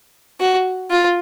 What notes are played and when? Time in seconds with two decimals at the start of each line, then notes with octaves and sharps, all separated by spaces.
0.40 F#4
0.91 F4